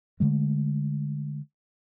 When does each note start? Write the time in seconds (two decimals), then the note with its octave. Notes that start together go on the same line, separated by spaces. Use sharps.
0.20 D3 G#3 A3